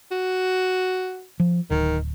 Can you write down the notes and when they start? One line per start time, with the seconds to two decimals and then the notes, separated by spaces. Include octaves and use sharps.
0.11 F#4
1.40 F3
1.70 D1 D#3